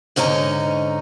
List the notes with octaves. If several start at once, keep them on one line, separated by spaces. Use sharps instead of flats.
G#2 D3 C#4 D#4 A#5